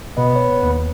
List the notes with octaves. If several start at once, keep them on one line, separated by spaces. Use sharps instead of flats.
B2 B3 D#5
C#5
D#2